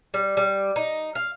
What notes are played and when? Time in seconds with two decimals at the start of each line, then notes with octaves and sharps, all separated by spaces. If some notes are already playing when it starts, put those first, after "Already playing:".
0.14 G3
0.37 G3
0.76 D#4
1.15 F5